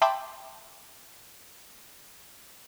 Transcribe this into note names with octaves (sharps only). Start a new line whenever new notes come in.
E5 G5 A5 B5 C6 D6